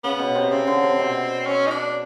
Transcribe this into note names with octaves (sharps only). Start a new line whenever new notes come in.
C#3 B3
B2
C3
C#3 C4
D3
C3
B2
C#4
D#4
D4